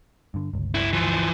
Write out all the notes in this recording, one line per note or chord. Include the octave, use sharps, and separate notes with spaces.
G2 D3
G1 C#2
D2 E4
E3 F3